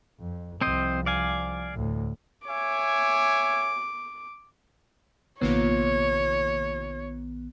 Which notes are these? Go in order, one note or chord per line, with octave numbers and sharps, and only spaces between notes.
F2
C2 F3 C4 C5 D#5
D5 F5 G#5
D2 A2
C#5 E5 G#5 D6
A#1 C3 D#3 A#3 B3 F4 C#5